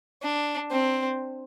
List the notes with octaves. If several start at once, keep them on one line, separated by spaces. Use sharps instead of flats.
D4
C4